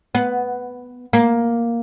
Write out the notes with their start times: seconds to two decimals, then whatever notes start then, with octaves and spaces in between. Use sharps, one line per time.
0.15 B3
1.13 A#3